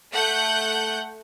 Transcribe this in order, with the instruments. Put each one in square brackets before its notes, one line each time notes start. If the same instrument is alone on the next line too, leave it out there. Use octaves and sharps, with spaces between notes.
[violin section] A3 F#5 F#6 G6